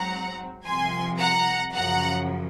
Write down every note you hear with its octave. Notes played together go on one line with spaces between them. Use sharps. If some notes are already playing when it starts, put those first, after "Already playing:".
Already playing: G#2 F#3 C4 F#5 A#5
C2 C3 F3 G#5 C6
F#5 A#5
F#2 C#3 F3 F#5 A#5